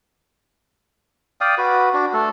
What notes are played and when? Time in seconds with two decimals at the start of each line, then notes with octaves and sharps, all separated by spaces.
1.41 D5 F5 G5 D#6
1.58 F#4 B4
1.94 D4 F#4
2.13 A3 A4